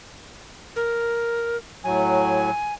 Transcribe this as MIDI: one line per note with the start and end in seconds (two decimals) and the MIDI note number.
0.76 1.57 70
1.84 2.50 45
1.84 2.50 54
1.84 2.74 80